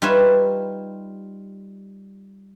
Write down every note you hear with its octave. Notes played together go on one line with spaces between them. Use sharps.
G3 D#4 F4 B4 C#5 E5